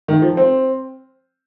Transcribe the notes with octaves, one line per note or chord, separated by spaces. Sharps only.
D#3
F3
C4